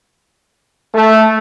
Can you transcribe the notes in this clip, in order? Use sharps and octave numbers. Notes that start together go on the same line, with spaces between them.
A3